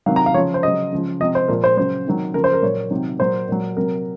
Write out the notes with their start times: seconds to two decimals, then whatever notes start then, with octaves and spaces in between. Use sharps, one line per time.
0.06 C3 D#3 F#3 F5
0.16 A#5
0.26 F5
0.34 C#3 F3 C#5
0.54 C5
0.63 C#3 F#3 D#5
0.93 C#3 F3
1.20 C3 F3 D#5
1.35 C5
1.48 A#2 F3 A#4
1.64 C5
1.77 C#3 F#3 C5
2.06 C3 D#3 F#3
2.34 C#3 F3 A#4
2.44 C5
2.53 A#4
2.62 A#2 F#3 C#5
2.91 C3 D#3 F#3
3.19 A#2 F#3 C5
3.49 A#2 F#3
3.77 C3 F#3 A#4